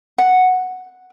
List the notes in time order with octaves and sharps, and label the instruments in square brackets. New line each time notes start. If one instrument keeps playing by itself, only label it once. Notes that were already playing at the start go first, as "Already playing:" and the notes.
[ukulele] F#5